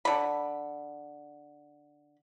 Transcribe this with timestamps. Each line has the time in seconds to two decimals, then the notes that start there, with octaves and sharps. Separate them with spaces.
0.05 D3 B5